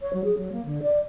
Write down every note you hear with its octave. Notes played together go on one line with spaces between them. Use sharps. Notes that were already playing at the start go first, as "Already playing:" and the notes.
C#5
F#3
G#4
F#3
A#3
D3
D5